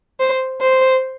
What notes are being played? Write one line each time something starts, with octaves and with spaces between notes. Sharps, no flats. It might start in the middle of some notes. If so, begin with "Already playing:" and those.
C5
C5